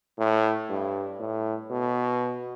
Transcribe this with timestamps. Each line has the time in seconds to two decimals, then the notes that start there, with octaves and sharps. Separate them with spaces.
0.18 A2
0.69 G2
1.20 A2
1.71 B2